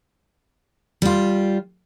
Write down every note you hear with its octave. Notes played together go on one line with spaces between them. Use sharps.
G3 F4